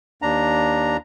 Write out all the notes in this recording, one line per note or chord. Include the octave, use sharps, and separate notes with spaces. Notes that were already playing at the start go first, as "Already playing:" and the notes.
D#2 D4 A#5